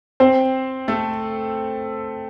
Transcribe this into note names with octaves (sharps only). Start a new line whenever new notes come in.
C4 C5
A3 A4